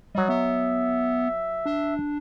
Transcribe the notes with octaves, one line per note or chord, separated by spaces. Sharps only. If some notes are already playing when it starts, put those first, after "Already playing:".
F#3 G3 D#5
B3 E5
D4